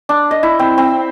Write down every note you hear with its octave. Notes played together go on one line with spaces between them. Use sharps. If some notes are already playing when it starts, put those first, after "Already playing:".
D4
D#5
E4
C4
C4